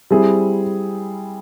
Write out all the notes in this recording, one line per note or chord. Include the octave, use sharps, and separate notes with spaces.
G3 C4 E4 G#4